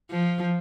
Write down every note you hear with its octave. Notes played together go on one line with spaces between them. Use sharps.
F3